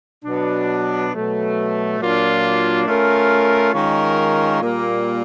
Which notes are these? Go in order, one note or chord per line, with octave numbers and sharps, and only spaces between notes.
B2 F#3 B3 D4
B2 F#3 A3
A#2 F#3 A#3 D4 F4
A3 C#4 F4 A#4
D#3 G#3 C#4 F4 A#4
A#2 G3 A#3